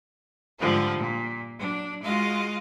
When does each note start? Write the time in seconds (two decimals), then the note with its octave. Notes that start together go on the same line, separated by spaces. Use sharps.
0.59 G#2 D3 F3 G3 F4
0.98 A#2
1.59 F#3 D4
2.03 G#3 F4 F#4 D#5 F5